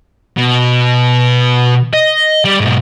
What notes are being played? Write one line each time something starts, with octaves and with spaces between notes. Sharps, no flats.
B2
D#5
G3
G#2 B2